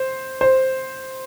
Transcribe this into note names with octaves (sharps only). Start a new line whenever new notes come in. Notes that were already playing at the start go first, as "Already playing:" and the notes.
Already playing: C5
C5